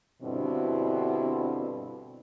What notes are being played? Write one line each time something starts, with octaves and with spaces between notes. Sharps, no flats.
G2 B2 D3 C4 E4